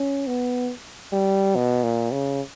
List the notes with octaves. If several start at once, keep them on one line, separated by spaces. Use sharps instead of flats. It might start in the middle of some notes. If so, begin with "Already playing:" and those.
Already playing: C#4
B3
G3
B2
A#2
C#3